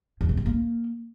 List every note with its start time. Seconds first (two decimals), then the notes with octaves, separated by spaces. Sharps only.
0.21 E2
0.29 B2
0.37 G3
0.46 A#3